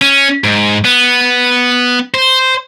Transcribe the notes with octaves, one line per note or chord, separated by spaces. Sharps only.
C#4
G#2
B3
C5